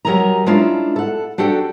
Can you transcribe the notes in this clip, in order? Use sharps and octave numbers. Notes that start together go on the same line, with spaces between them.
F#3 G3 A#4 D#5 G#5 A#5
G#3 A#3 C#4 D4 E4 F4
A4 F#5
D4 F#4 G4 A4 D5 G5